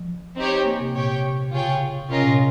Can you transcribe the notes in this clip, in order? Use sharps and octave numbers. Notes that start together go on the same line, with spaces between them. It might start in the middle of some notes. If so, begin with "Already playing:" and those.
Already playing: F3
C4 D#4 G4 C#5
A#3
C3
A#2 G4 C#5 G5
C3
C#3 F4 G#4 C#5 G5
C3 C#4 F4 A#4 D#5
A#2
C3